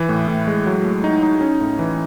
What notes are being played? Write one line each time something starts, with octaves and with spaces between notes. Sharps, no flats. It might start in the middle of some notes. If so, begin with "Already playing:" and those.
Already playing: E3
A2
A2
G#3
F#3
A3
D#4
D#4
C#4
A2
E3